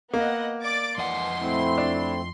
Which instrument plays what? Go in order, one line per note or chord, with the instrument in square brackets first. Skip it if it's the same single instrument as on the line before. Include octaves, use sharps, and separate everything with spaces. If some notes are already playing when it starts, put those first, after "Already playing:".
[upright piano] A#3 [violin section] B3 D#5 F#5
[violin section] D5 D6 A6
[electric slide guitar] F2 D#5 F#5 [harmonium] E3 [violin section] C6
[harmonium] A3 C4 E4
[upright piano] D4